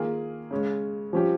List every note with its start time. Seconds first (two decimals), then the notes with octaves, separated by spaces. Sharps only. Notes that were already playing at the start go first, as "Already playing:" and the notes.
Already playing: D#3 A#3 F4 G#4
0.51 C#3 G#3 C#4
1.13 F3 G3 C#4 G4